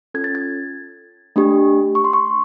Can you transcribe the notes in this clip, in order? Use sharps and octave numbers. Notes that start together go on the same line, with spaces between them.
C#4 F4 A4 G#6
A6
G#6
A3 D4 G4
C#6
C6
C#6